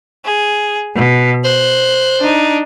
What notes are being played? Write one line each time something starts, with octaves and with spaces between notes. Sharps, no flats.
G#4
B2
C5 F#6
D4 D#4